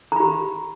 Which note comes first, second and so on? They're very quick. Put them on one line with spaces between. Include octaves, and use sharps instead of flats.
A#5 B5 G4